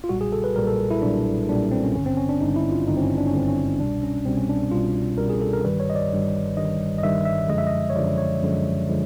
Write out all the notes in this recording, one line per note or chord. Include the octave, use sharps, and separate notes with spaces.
F4
B1 A#2 G3 F#4
G#4
A4
B4
B1 A#2 G3 A#4
A4
E4
B1 A#2 G3 D4
B1 A#2 G3 D4
C4
C#4
G#1 G2 D3 C#4
C4
C#4
D4
G#1 G2 D3 D#4
E4
F4
G#1 G2 D3 D#4
C4
C#4
D4
C#4
G#1 G2 D3 C4
C#4
C2 B2 G3 D4
C#4
C2 B2 G3 C4
C#4
D4
C2 B2 G3 F4
C2 B2 G3 A#4
G#4
A4
A#4
G1 G2 D#3 G3 B4
C#5
D#5
D5
G1 G2 D#3 G3
G1 G2 D#3 G3 D#5
D#5
G1 G2 D#3 G3 E5
E5
F#2 D3 F3 G#3 D#5
E5
D#5
C#5
F#2 D3 F3 G#3 D5
C#5
F#2 D3 F3 G#3
D3 F3 G#3